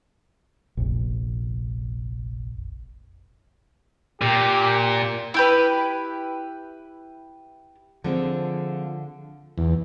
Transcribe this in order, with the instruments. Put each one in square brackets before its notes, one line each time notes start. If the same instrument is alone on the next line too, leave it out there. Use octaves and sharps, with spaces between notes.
[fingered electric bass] F1 A#1
[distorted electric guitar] A#2 [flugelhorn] G4
[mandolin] E4 G4 B4
[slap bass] D3 [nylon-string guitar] F3 C4 G#4
[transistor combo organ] E2